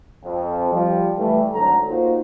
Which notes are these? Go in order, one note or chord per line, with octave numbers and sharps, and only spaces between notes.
F2
F3 G3
E3 G3 A3
G#1 D2 D3 F#3 A4 A#5
A#3 D#4 F4 F#4 C5